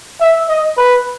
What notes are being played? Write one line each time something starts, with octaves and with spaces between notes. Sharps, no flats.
E5
D#5
B4